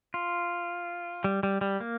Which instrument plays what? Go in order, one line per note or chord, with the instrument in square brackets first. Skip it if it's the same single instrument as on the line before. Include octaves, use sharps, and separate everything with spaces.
[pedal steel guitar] F4
G3
G3
G3
A#3